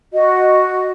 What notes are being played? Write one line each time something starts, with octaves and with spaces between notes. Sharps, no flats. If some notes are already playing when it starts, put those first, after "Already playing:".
F#4 D#5